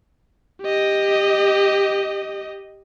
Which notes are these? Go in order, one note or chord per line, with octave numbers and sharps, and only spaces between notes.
G4 D#5